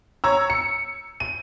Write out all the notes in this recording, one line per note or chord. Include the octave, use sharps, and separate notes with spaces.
C#5 A#5 E6
C#7
D#7